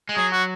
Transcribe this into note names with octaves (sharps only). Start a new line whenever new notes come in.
G#3
F#3 G#4
F#4